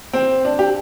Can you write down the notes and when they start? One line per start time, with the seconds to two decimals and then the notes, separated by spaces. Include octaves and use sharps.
0.13 C4
0.45 D4
0.59 G4